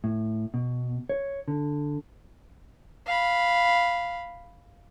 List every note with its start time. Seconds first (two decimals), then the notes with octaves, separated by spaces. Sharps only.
0.04 A2
0.54 B2
1.10 C#5
1.48 D3
3.07 F5 B5